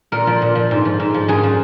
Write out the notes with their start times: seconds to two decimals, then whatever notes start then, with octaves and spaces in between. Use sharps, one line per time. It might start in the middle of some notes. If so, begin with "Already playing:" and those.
0.12 A#2 A#4
0.27 F3
0.42 A#2
0.55 F3
0.71 G#2
0.85 F3
1.00 G#2
1.14 F3
1.28 F#2 G#4
1.43 F3